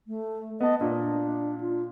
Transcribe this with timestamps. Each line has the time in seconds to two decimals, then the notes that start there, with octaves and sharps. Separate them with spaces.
0.07 A3
0.61 B3 D#5 A5
0.81 A#2 D4
1.60 F4